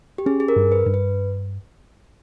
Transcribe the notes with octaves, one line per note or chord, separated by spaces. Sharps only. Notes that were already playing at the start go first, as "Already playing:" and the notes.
G4
C#4 G#4
G#4
A#4
G2
B4
G2
B4